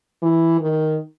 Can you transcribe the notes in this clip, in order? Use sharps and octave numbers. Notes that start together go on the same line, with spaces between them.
E3
D#3